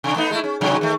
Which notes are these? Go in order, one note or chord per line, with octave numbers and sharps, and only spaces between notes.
C3 D4
A3 B3 D#4
G#3 A3 E4
C#4
G#2 C3 F#3
D#3 A3